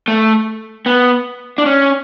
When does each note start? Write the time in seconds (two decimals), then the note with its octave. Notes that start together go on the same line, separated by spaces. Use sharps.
0.08 A3
0.86 B3
1.58 D4
1.66 C#4